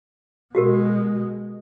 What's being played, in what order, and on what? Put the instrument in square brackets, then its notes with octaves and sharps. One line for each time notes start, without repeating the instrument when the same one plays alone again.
[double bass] B2 G#3 [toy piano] F#4 G4 A#4